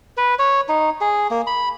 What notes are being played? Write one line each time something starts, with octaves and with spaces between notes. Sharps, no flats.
B4
C#5
D#4
G#4
A#3
B5